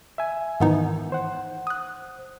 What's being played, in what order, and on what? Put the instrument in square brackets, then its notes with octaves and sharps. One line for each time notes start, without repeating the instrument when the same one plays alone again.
[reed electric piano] E5 G#5
[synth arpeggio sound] G#2 B3 D#4 [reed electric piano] D#3 E3
[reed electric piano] C5 F#5
[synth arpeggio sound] D#6 F#6